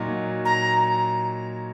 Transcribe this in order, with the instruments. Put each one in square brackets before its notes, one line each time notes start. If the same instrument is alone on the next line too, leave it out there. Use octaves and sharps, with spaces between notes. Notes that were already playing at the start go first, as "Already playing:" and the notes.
Already playing: [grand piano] A#2 F#3 D#4
[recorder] A#5